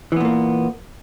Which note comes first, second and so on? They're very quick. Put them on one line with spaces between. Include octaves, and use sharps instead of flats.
E3 B3 A#2 A#3